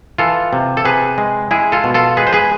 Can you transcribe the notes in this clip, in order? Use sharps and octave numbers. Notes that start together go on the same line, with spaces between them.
E3 F4 A4
C3
A4
C3 G#4 B4
G#3
G#3 E4 G#4
F4 A4
B2
F4 A4
G#3 G#4 B4
C5
G#4 B4